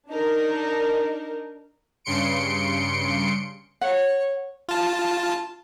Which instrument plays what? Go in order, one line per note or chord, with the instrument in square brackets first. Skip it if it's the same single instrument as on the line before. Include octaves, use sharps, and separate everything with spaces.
[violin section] D4 D#4 A#4
[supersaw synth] G2 C#3 C6 C#7 D7
[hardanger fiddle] C#5 [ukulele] F#5
[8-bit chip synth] F4 A5